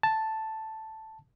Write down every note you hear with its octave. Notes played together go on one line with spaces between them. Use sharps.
A5